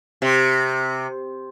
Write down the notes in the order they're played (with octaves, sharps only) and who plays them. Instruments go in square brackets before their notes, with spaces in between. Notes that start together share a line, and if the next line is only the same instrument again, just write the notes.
[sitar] C3